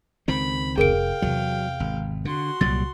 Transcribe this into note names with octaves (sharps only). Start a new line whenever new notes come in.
C#2 D#3 C4 B5
F1 G#4 A#4 F5 G5 D7
E2 C3 F#3
G#1
D3 F#4 C6
C2 A#2 F#3 G3 A6